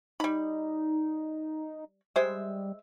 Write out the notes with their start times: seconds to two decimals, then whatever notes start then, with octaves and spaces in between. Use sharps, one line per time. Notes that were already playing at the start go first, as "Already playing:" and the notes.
0.20 G3 D#4 B5
2.16 G3 G#3 C5 E5